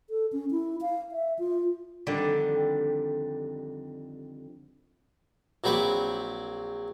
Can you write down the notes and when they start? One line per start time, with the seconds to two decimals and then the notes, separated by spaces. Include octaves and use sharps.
0.10 A4
0.32 C#4
0.51 E4
0.81 F5
1.12 E5
1.39 F4
2.07 F2 D3 D#3 G3
5.64 A#1 F#3 C4 B5 C#6 D6